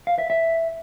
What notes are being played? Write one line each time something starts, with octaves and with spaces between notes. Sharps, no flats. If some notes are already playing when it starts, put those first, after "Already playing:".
F5
E5
E5